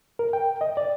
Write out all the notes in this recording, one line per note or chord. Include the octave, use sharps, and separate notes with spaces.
A#4
G5
D#5
D5